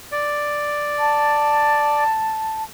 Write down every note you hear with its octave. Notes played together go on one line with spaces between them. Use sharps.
D5
A5